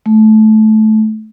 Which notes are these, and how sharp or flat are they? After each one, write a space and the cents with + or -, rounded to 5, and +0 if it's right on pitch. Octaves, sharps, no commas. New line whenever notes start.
A3 -20